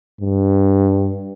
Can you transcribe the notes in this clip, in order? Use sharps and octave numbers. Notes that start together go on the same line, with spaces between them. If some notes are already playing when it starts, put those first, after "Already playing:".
G2